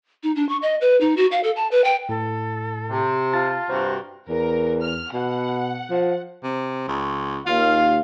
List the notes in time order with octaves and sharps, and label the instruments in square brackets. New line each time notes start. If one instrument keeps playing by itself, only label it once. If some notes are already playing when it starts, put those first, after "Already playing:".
[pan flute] D#4
D4
C#6
D#5
B4
D#4
F#4
F5
A4
A5
B4
G5
[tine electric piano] A2 [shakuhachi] A4
[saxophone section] C3
[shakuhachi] F4 [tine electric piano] A5 A6
[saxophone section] G2 C3 F#4 [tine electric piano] C5 A#5
[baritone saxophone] E2 [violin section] A#4
[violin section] F6
[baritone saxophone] B2 [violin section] F#5
[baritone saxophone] F3
C3
C#2
[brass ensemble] D#2 F5 [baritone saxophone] F4